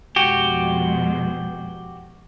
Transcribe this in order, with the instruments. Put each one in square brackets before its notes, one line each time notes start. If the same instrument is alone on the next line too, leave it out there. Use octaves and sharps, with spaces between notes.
[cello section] F2 B2 G#3 [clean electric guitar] F#4 G4